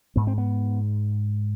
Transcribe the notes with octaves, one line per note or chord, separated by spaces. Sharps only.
G#2 B3
C4
B3